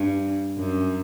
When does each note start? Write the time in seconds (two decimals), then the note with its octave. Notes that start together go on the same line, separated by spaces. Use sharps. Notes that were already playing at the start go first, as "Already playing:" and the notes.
Already playing: G2
0.58 F#2